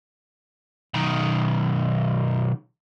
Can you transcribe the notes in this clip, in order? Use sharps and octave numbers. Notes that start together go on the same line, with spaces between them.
B1 D#3